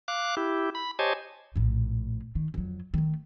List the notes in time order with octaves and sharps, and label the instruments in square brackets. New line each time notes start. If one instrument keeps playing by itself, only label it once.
[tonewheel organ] F5 D6 F#6
E4 G4
B5
G4 C5 C#5 D#5 G#5 A5
[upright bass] A#1 A2
D#3
F2 F#3
D#3 A3